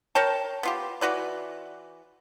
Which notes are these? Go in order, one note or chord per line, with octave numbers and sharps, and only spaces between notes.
A#4 C#5 G5 A5
B3 F4 G4
E3 F#4 B4 D5